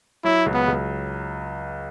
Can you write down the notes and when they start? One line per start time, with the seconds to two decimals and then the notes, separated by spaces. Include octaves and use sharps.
0.24 F#3 E4
0.46 C#2
0.54 B3
0.68 C#2